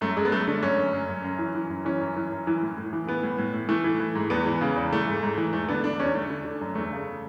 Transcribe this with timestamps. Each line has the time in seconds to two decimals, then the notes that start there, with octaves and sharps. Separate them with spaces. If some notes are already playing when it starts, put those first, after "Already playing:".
0.01 F#2 A3
0.17 F#2 G#3
0.25 B3
0.32 F#2 A3
0.47 D3 A3
0.63 F#2 C#4
0.78 F#2
0.93 F#2
1.09 F#2
1.24 F#2
1.39 E3
1.55 E3
1.70 F#2
1.85 E3 C#4
2.01 F#2
2.16 E3
2.32 F#2
2.47 E3
2.62 A2
2.77 A2
2.93 E3
3.07 E3 B3
3.23 A2
3.38 A2
3.53 A2
3.69 E3 A3
3.84 E3
4.00 E3
4.15 G#2
4.30 E2 B3
4.46 E3
4.61 C#3
4.76 E2
4.93 E3 A3
5.07 G#2
5.23 G#2
5.38 E3
5.53 E2 A3
5.69 D3 B3
5.84 D3 D4
6.00 E2 C#4
6.15 D3 A3
6.30 D3
6.45 D3
6.61 F#2
6.75 E2 A3
6.91 C#3